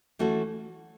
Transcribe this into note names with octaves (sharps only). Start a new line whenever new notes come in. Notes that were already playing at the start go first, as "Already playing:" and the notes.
E3 A3 C#4 F#4 A4